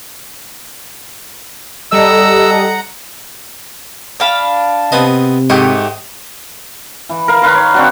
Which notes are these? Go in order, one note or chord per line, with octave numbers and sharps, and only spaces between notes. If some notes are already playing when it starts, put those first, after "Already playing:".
G3 A4 D#5 F#5 A#5 E6
D4 F5 B5
C3 B3 C4 D#5
G#2 A3 G4 D#5 G5 C#6
E3
A#4 F5
D#3 B4 F5 C6
C#5
C4 D4 F#4